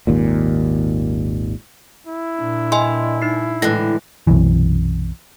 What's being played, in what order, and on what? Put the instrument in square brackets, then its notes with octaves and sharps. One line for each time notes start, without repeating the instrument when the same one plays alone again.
[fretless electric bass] G#1 D#2 A#2
[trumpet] E4
[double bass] A#2 D4
[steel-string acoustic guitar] G2 [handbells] D#5 G#5 C6
[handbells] D#4 C7
[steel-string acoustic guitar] A2 D3 [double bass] E3 G#3 [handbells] F#6 A#6
[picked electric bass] B1 F#2 C3 E3